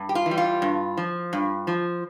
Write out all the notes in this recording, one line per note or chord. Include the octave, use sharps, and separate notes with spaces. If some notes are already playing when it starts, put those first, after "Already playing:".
Already playing: G2
G4
F4
E3
G3
F4
G2
F3
G2
F3